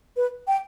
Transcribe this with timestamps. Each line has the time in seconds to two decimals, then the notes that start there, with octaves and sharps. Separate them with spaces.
0.16 B4
0.48 G5